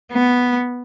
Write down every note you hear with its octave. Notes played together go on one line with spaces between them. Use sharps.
B3